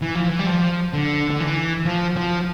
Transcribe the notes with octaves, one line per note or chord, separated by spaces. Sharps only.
E3
F3
E3
G3
F3
D3
D3
E3
F3
F3